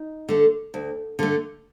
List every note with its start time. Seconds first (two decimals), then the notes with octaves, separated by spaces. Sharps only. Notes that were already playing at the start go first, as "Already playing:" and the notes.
Already playing: D#4
0.29 D3 A3
0.74 D2
1.19 D3 A3